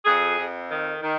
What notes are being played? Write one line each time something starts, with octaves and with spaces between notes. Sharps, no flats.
F2 G#4
F2
D#3
D#3